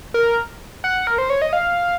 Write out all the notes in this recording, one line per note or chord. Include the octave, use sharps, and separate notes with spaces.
A#4
F#5
A#4
C5
C#5
D#5
F5